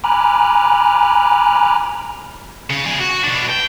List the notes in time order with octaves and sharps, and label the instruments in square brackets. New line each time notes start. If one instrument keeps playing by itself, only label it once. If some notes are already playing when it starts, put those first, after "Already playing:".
[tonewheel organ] G#5 A#5 B5 D6 F6 F#6
[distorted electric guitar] C#3
F3 G#4
F#4
B2 D4
G5